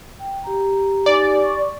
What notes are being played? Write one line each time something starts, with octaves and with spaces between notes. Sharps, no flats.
G5
G4 A#5
D#4 G4 D5 G#5
C#6